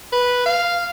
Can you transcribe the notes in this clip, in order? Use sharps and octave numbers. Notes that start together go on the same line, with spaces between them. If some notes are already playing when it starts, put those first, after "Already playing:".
B4
F5